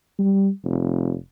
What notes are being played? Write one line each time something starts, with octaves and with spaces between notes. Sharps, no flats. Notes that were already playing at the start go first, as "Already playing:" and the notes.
G3
F1